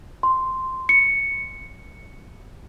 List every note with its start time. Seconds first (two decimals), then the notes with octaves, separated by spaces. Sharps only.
0.23 C6
0.89 C#7